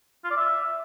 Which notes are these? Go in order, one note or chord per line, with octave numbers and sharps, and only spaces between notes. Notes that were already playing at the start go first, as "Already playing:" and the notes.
F4
D5
E5